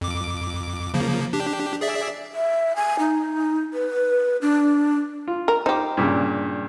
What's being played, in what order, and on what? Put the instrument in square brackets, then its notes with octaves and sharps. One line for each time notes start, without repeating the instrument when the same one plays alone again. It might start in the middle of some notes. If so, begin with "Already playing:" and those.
[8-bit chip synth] F2 D6
C#3 F3 A#3
D4 G4
G#4 D5 E5
[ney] E5
G#5
D#4
B4
D4
[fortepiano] F4
[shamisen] A#4
[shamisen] D#4 G4 [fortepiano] C5 D6
[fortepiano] G2 A#2 C#3